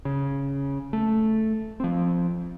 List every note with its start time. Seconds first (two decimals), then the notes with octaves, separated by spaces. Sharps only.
0.05 C#3
0.93 A3
1.80 F3 C4